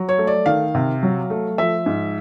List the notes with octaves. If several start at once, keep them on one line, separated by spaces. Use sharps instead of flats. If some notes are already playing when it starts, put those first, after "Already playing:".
Already playing: F#3
C#5
A3
D5
D#3 F5
C3
F#3
A3
F3 E5
G#2